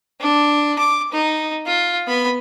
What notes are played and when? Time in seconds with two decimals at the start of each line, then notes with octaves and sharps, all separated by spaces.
0.20 D4
0.79 D6
1.12 D#4
1.66 F4
2.07 B3 B5